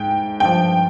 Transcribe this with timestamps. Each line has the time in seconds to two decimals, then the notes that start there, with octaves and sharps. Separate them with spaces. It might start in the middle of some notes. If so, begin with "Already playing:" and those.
Already playing: G#2 G5
0.40 G2 F3 G5